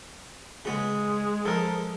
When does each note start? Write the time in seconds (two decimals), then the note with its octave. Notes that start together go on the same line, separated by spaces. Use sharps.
0.65 C#3 G#3 B3
1.45 F3 A4 A#4